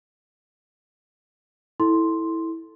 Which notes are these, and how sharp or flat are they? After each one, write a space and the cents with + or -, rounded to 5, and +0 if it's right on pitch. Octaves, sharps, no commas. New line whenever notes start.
E4 -10 A4 +0 C6 +0